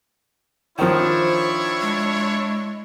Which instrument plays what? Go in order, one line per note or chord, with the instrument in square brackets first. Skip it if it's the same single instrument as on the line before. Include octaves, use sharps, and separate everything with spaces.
[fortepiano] D#3 F3 [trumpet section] D4 E4 C#5 [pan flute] C5
[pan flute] G#3